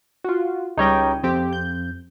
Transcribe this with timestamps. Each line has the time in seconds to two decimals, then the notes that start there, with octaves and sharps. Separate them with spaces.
0.24 F4 F#4
0.78 C#2 G3 D#4 C#5 D#5 G5
1.23 F2 C4 G4
1.53 G6